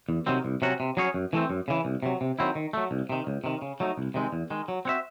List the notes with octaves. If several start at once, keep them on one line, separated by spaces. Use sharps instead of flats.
E2
C3 D#3 F#3 C4
C2
C3 F#3 C#4 F#4
C3
F#3 C#4 G#4 C#5
F#2
E3 A3 C4
F#2
C#3 E3
C2
C3 F#3
C3
D#3 F#3 C4 E4
D#3
F#3 A3
C2
C3 D#3
C#2
C3 D#3
C#3
F#3 A3 D#4
C2
C3 D#3 G#3 C4
E2
D#3 G#3
F#3
C4 F#4 C#5 E5